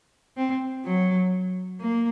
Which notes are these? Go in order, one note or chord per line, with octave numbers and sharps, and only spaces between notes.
C4
F#3
A#3